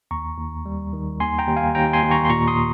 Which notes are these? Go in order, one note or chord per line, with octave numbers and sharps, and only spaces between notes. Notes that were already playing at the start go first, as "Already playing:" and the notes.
D#2 A#5 C#6
D#2
G3
D#3
D#2 G#5 C6
G5 A#5
D#2
F5 G#5
D#2 G5 A#5
G#5 C6
D#2
A#5 C#6
C6
A#2 A#5 C#6
C6 D#6